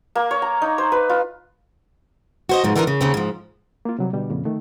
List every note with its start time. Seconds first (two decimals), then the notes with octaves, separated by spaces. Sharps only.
0.15 A#3
0.31 C#5
0.42 A#5
0.62 D#4
0.78 C5
0.92 B4
1.09 F4
2.49 F#4 C5 D#5
2.64 G#2 B2 F3
2.76 D3 E3 A#3 F4 A4 A#4
2.87 C#3
3.01 D#2 C#3 A#3 C4
3.14 G#2 F3
3.85 A#3 F4
3.99 C3 F#3 G3
4.13 B2 D3 G3
4.30 F2 A#2 C#3
4.45 D#3 A3